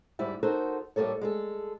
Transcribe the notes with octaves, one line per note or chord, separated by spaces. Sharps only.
D2 G#2 G3 E4 E5
D#4 F#4 A4 A#4 C5
A2 G3 A#3 A4 C#5
G#3 G#4 A4